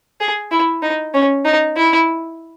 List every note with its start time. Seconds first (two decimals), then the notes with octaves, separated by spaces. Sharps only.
0.20 G#4
0.51 E4
0.83 D#4
1.14 C#4
1.45 D#4
1.76 E4